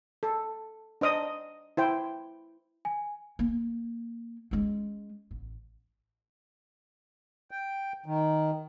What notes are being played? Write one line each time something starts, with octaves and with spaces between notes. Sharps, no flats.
A4
D4 C5 D#5 D#6
E4 C5 G5
G#5
A#3
G#3 C#4
A1
G5
D#3